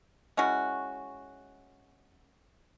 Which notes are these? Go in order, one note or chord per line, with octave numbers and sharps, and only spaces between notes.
G#3 C#4 E4 F#4